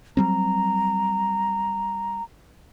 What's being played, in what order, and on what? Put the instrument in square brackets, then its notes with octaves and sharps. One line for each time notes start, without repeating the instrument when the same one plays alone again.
[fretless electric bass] F#3 G3 C4 [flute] A#5